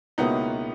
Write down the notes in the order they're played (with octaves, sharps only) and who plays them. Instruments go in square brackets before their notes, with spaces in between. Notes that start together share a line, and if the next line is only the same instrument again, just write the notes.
[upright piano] C#2 B2 A#3 C#4 E4 [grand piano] B3 D#4